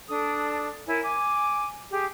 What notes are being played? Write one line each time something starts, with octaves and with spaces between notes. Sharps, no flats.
D4 A4 D#6
E4 A#4 C#5 G#5
G#5 D6
G4 G#4